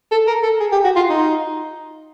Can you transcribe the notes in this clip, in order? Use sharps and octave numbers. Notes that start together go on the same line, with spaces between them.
A4
A#4
A4
G#4
G4
F#4
F4
D#4